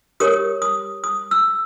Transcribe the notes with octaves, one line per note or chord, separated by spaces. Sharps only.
G4 A#4 C#5 D#6
D#6
D#6
E6